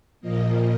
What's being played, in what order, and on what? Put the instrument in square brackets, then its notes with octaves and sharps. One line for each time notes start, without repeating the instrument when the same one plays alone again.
[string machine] A#2 F3 A#3 D#5